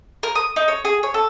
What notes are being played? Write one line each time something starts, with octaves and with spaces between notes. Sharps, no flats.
A#4
D#6
D#4
C#5
G#4
C#5
A4